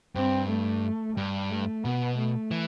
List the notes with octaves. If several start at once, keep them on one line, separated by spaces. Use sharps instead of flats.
G2 C4
A3
G2 G3
A3
B2 B3
A3
E3